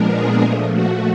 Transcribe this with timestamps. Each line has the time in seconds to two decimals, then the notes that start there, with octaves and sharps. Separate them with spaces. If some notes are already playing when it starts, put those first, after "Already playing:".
Already playing: A#2 F3 G#3 B3 D4 A#4
0.13 G#4
0.42 A#2 F3 A3
0.72 F#4